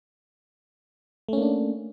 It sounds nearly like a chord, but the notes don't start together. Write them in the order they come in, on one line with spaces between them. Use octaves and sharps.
A3 C#4 A#3 D4